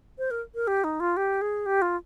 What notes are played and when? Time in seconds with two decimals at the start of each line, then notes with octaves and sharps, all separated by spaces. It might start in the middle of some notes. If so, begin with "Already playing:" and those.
0.18 C5
0.31 A#4
0.55 A#4
0.67 G4
0.84 D#4
1.00 F4
1.17 G4
1.41 G#4
1.66 G4
1.82 F4